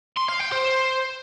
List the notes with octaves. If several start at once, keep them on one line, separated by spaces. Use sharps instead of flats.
C6
F5
G5
C5